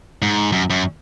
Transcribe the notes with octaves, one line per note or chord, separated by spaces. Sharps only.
G#2
F#2
F#2